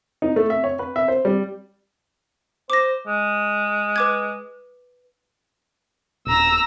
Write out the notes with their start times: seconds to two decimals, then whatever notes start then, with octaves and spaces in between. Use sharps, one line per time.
0.22 D#4
0.36 A3
0.50 E5
0.64 C#5
0.79 B4
0.96 E5
1.08 C5
1.25 G3
2.70 C5 D6 A#6
3.07 G#3
3.96 B4 D6 G#6
6.27 D#1 A#5 E6